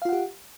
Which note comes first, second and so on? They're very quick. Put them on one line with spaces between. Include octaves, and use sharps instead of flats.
F5 F4 F#5 G4